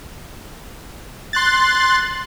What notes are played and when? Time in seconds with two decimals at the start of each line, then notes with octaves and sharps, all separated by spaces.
1.33 C6 F#6 A6